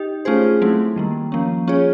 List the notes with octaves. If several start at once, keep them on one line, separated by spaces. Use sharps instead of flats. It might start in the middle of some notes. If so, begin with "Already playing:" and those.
Already playing: D#4 G4
A3 C#4 F4 G#4 C5
F#3 A3 C4 E4
D#3 G3 A#3
F3 A#3 C#4
C#4 F4 G#4 C#5